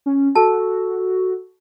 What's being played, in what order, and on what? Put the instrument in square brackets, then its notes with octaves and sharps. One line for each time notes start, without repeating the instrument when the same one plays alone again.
[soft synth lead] C#4
[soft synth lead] F#4 [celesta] A4 E6 [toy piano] A5